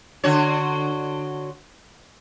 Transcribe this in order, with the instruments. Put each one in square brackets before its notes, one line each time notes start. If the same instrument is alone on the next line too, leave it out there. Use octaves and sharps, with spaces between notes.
[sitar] D3 F#4 C#5